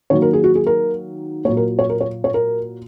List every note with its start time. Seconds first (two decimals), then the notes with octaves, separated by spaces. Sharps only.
0.10 D#3 F#3 A#3 C#5
0.22 A#4
0.33 G#4
0.44 F#4
0.55 G#4
0.67 A#4
1.45 A#2 F#3 A#3 C#5
1.57 A#4
1.79 C#5
1.90 A#4
2.01 C#5
2.24 C#5
2.34 A#4